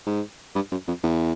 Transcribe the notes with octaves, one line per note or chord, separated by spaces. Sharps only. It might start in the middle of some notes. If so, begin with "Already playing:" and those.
G#2
G2
F#2
F2
E2